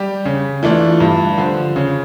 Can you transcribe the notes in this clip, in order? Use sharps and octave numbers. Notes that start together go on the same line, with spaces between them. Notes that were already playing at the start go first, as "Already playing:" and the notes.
Already playing: G3 G4
C#3
E3 A3 D4 F4
G2
D3 F3
C#3